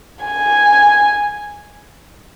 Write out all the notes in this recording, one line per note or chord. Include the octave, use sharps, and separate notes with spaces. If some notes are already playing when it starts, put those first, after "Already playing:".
G#5